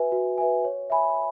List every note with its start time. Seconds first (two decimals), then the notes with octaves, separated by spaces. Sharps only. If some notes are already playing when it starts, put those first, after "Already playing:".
Already playing: F#4 B4 E5 G#5
0.12 F#4
0.38 B4 E5 G#5
0.64 C#5
0.90 E5 G#5 B5